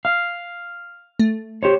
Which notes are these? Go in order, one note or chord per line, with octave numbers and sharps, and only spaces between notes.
F5
A3
G4 C5 C#5